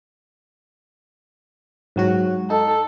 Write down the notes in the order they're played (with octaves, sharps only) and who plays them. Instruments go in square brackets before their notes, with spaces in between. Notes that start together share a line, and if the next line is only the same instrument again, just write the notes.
[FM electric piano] G#2 F#3 F#4
[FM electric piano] D#4 [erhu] A4